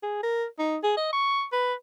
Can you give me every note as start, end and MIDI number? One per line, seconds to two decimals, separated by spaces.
0.03 0.19 68
0.23 0.46 70
0.59 0.78 63
0.83 0.94 68
0.97 1.08 75
1.13 1.44 85
1.53 1.74 71